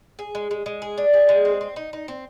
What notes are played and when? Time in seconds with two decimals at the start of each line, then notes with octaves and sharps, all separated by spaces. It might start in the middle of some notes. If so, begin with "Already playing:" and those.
0.19 G#4
0.35 G#3
0.51 G#3
0.66 G#3
0.82 G#4
0.98 D4
1.13 G#4
1.29 G#3
1.45 C4
1.61 C4
1.76 D#4
1.93 D#4
2.08 C4